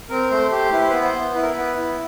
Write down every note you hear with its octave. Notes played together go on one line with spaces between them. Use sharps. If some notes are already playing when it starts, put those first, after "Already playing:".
C4 A#4
A3 C5
G4 C5
E4 B4
C5
B3 B4
C5
B3
E4 B4
A#4
B4
B3
E4